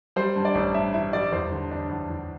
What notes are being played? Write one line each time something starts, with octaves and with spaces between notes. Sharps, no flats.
G3 C5
G2
D5
A1
G2 E5
E3 E5
G3 D5
E2 C5
D3
D4
E2
E2